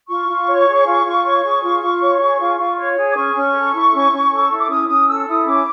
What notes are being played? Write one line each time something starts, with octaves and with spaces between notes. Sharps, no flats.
F4 C#6
F4
C#5
G#4
F4
F4
C#5
G#4
F4
F4
C#5
G#4
F4
F4
C#5
G#4
D6
C#4 C#6
C#4
A4
E4
C#4
C#4
A4
E4
D6
C#4 D#6
C#4 D#6
A4 E6
E4 D#6
C#4 D6